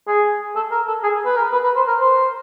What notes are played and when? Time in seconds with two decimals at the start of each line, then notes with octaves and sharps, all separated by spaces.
0.07 G#4
0.56 A4
0.71 A#4
0.88 A4
1.03 G#4
1.25 B4
1.36 A#4
1.52 B4
1.64 B4
1.76 C5
1.88 A#4
2.00 C5